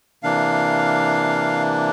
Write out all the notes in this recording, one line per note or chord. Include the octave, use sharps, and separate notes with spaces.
C3 E3 A#3 D4 F5